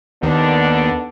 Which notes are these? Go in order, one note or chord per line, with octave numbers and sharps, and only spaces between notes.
D#2 D3 D#3 B3 D4